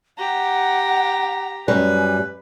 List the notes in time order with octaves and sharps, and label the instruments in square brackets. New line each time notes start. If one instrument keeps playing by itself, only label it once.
[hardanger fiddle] G4 A#5 [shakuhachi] F#5
[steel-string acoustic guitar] F#2 G3 [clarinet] B4 [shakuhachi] G#5